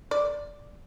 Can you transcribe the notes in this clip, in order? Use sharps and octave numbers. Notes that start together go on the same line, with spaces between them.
D5